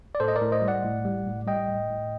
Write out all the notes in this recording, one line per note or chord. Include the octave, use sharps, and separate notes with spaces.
D5
A2 A4 C5
D#5
A#4 D5
A2
C5 D#5
G3
D5 F#5
A2
G3
A2
G3 D#5 G5
A2
A2